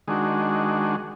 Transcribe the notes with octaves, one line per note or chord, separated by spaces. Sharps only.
D#3 G#3 D4 F#4